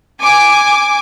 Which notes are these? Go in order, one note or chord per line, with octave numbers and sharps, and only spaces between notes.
G#5 D6